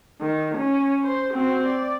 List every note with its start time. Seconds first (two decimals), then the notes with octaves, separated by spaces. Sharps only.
0.21 D#3
0.58 C#4
1.03 C5
1.33 C4 F#4
1.66 D5